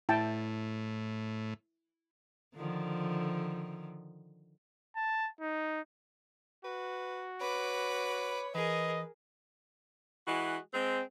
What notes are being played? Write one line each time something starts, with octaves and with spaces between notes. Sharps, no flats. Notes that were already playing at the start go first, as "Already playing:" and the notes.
A2 E4 G5 A5
D3 D#3 F3
A5
D#4
F#4 B4
B4 C#5 B5 D6
E3 G#4 A#4 B4 D#5
E3 G#3 F#4
G#3 C4